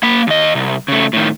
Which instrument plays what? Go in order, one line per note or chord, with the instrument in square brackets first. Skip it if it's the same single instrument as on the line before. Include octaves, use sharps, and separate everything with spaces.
[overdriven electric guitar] A#3 B5
D#2 D#5
C2
C#3 A3
A2 D#3